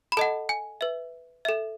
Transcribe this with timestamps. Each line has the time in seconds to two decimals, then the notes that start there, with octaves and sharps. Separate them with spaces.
0.12 B5
0.17 A4 D#5 F#5 A5
0.49 G#5
0.81 B4 E5
1.45 A4 E5